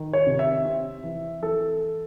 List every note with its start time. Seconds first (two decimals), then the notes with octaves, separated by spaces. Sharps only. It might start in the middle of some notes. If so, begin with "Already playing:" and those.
Already playing: D#3
0.13 C#5
0.26 C3
0.39 E5
0.65 C4
1.04 E3
1.42 E3 A4